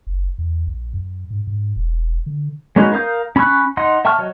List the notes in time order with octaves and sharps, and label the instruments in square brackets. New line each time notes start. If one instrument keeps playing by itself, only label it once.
[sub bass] F#1
E2
A#1
F#2
G#2
G#2
E1
D3
[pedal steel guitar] G#3 B3 C#4 D#4 F#4
A#4 F5 D#6 G6
C#4 B5 C#6 E6 F#6
D#4 D#5 F#5 C6
E5 G5 A5 C#6 F6
F#3 C#5 D#5